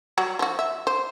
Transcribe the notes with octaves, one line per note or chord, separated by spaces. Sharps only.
F#3 G3 F#4
F3 F#4
E5
C5